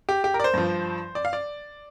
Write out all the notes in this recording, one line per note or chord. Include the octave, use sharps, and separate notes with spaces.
G4
G4
A#4
D5
C5
G2 F3
D5
F5
D5